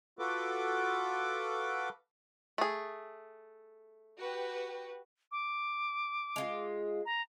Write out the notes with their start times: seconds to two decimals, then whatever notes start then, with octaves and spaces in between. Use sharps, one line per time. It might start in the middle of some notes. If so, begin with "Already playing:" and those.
0.19 F4 F#4 A4 B4 D6
2.58 A3 G#4
4.19 F#4 G4 B4
5.32 D6
6.36 G#3 F4
7.06 A#5